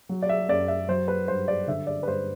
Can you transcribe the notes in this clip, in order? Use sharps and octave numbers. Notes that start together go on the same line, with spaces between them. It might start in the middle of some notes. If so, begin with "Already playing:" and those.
F#3
D5
E5
F#2 D5
E5
F#3 C5
B4
G2 C5
D5
D3 E5
D5
B4
G2 C5